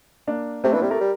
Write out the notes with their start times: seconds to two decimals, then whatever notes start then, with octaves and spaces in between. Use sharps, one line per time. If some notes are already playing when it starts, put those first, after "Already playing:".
0.27 A#3 D4
0.64 C3 A3 C4
0.73 E3 A#3 D4
0.82 G3 C4 E4
0.91 A3 G4 A#4
1.01 G3